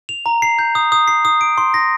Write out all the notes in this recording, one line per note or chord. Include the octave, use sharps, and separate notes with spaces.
F7
A#5
C7
G6
D#6
D#6
C7
D#6
D7
C6
A#6